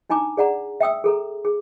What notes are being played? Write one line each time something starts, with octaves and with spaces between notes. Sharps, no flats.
D4 D#4 G#5 A#5 D6
G#4 D5 F#5 A#5
E5 G5 D#6 E6
G#4 A4 A#5
G#4